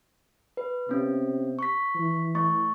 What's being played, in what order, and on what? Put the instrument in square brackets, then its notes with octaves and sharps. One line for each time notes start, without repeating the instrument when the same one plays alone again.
[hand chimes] B4
[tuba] C3 [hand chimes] B3 C#4
[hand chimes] C#6 B6
[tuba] E3
[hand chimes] A3 C#6 A6